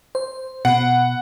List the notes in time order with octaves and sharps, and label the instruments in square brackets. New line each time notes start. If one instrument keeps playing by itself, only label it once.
[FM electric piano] C5
[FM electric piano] B2 [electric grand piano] F#5